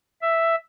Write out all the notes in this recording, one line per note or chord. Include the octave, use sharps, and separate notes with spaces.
E5